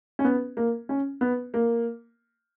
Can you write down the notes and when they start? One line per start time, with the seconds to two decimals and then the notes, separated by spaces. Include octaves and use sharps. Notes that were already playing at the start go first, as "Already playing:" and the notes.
0.19 C#4
0.24 B3
0.57 A#3
0.89 C#4
1.21 B3
1.54 A#3